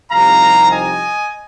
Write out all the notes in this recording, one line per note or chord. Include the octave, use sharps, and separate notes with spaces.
C2 C3 F3 C4 D#4 F5 A#5
D#5 G#5